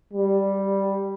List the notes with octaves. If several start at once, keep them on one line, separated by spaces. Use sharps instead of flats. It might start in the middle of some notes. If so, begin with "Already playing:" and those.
G3